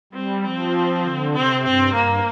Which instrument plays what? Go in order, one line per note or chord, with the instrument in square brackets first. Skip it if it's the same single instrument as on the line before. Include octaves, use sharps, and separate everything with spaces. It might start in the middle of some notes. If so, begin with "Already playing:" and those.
[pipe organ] G3 [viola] C4
[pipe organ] F3 [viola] C4
[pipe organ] D3
[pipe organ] C3 [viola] C4
[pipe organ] G2 [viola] C4
[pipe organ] G2 [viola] A#3